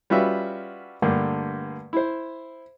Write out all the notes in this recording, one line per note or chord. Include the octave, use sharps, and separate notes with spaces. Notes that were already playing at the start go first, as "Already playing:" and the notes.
G3 C#4 F4 F#4 B4 E5
G2 D3 A3 A#3
E4 C5